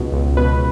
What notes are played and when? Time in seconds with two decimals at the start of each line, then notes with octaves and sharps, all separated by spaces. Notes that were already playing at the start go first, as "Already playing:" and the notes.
Already playing: C#2 B2
0.12 C#2
0.37 B2 B4